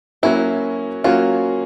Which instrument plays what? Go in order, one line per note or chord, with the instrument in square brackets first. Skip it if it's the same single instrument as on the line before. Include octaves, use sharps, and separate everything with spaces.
[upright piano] F#3 A#3 C#4 F#4 [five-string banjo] E4
[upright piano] F#3 A#3 C#4 F#4 [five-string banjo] F4